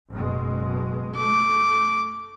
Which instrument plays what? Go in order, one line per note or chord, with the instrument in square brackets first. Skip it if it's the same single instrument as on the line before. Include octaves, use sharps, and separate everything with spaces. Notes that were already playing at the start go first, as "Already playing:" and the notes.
[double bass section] F#1 B2 G#3
[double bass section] A3 [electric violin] D6